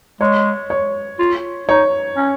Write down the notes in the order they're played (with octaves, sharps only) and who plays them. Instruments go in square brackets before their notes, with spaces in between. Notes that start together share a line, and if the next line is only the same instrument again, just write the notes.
[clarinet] G#3 [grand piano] C#5
[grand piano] C#5
[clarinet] F4
[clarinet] D#4 [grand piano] C#5
[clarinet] C#4